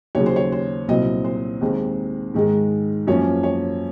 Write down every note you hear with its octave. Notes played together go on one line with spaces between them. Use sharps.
D#2 C#3 F#3 C#5
C5
C#5
C5
C2 A#2 F#3 C4 D#5
C5
D#2 D#3 G#3 C4
G#2 D#3 G#3
F#2 F3 A#3 C#4 C#5
C#5